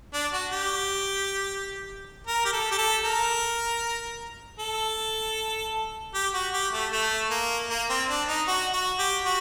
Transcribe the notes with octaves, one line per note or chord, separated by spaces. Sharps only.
D4
F#4
G4
A#4
G4
A4
G4
A4
A#4
A4
G4
F#4
G4
A3
A3
A#3
A#3
C4
D4
D#4
F#4
F#4
G4
F#4